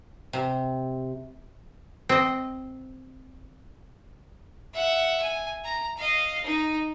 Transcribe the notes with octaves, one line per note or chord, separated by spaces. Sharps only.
C3
C4 D#5
E5 F#5
G#5
A#5
D#5 F5
D#4